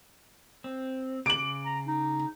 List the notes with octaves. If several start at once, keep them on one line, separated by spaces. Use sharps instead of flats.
C4
C#3 D6 F#6 D7 F#7
A#5
D#4